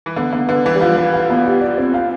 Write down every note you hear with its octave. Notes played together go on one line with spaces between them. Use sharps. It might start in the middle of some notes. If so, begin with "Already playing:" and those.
E3
D3 B3
D3 B3
D3 B4
E3 B4
G3
F3 F5
B4
F5
B3
G4
D5
C4
F5